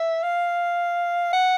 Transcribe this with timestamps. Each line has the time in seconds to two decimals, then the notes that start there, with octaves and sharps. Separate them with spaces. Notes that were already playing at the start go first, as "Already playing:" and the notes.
Already playing: E5
0.23 F5
1.33 F#5